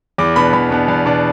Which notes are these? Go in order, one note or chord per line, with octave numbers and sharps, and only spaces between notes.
E2 D6
B2 B3 D4 B5
E2 B5
B2 B3 D4
E2
B2 B3 D4